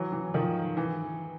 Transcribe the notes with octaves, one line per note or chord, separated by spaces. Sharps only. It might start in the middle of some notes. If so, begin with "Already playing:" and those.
Already playing: E3 F#3
E3
D#3 F3
E3